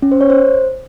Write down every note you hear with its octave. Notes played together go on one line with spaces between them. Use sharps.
C#4
C5
C#5
C5